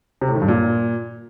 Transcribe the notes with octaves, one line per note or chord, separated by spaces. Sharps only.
C3
A2
D#3
G2
A#2